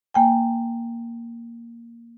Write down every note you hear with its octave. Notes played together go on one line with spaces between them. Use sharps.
A#3 G5 G#5